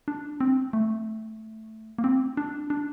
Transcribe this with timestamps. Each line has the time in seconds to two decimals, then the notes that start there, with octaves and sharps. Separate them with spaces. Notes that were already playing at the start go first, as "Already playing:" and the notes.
0.08 D4
0.41 C4
0.73 A3
1.98 A#3
2.04 C4
2.37 D4
2.70 D4